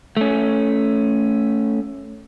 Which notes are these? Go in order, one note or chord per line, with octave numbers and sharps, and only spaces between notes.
A3 C#4